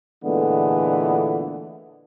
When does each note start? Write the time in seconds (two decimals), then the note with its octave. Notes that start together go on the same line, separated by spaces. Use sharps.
0.23 A#2 D3 E3 G#3 A3 B3